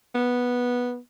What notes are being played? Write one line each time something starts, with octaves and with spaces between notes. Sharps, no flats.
B3